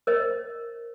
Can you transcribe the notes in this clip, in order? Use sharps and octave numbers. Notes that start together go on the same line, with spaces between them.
A#4 C5 D#5